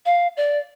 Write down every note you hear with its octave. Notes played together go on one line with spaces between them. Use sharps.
F5
D5